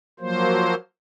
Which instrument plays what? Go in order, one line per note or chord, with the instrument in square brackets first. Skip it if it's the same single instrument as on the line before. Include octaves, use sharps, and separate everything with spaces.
[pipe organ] F3 F#3 A#3 C5